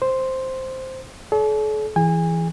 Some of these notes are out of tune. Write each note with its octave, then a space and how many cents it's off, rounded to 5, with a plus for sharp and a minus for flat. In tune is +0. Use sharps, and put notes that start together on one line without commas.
C5 +0 C6 +0
A4 -45 D5 -45
E3 +10 G#4 +0 G#5 -30